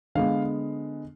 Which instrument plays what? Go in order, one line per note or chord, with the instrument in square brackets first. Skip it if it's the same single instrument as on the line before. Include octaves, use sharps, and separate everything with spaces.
[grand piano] D3 G#3 B3 F5